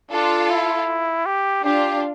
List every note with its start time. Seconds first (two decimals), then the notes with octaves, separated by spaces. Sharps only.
0.11 D4 F4 A4
0.50 E4
1.26 G4
1.64 D4 F4 G4